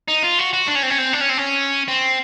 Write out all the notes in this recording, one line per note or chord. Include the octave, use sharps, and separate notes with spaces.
D#4
F4
F#4
F#4
D4
C#4
C4
C#4
C4
D4
C#4
C4
C#4
C4